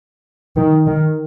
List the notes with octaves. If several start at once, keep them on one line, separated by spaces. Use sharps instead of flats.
D#3
D#3